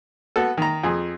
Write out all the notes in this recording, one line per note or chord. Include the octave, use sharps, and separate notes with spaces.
B3 F#4 A4
D#3 A#5
F2 G#4